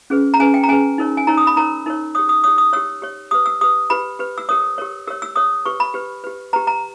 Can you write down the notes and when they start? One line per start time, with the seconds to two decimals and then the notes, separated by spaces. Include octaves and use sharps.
0.10 C#4 G#4 B4
0.34 A#5
0.39 C#4 G#4 B4 G#5
0.54 G5
0.63 A#5
0.68 C#4 G#4 B4 G#5
0.98 D#4 A#4 C#5
1.17 G#5
1.27 D#4 A#4 C#5 A#5
1.37 D#6
1.47 B5
1.56 D#4 A#4 C#5 A#5
1.86 D#4 A#4 C#5
2.15 G4 C#5 D#6
2.29 D#6
2.44 G4 C#5 D#6
2.58 D#6
2.73 G4 C#5 E6
3.02 G4 C#5
3.31 G4 B4 D#6
3.46 E6
3.61 G4 B4 D#6
3.90 G4 B4 B5
4.19 G4 B4
4.38 E6
4.49 G4 A#4 C#5 D#6
4.78 G4 A#4 C#5
5.07 G4 A#4 C#5 E6
5.22 E6
5.36 G4 A#4 C#5 D#6
5.65 G4 B4 C#6
5.80 B5
5.94 G4 B4
6.24 G4 B4
6.53 G4 B4 A#5
6.67 A#5